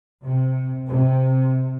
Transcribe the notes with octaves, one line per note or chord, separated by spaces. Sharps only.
C3
C3